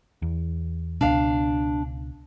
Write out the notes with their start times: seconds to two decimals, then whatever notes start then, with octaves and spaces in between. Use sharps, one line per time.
0.22 E2
1.01 C#2 B2 D4 F5